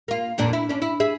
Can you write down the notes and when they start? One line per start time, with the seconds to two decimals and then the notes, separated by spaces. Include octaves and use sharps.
0.08 A#3 F4
0.38 F2 A#2 D4
0.53 E4
0.69 C#4 D4
0.82 E4
1.00 G#4 E5